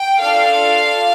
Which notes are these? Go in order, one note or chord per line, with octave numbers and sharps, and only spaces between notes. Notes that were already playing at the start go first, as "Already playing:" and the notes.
Already playing: G5
D4 F4 A4 F5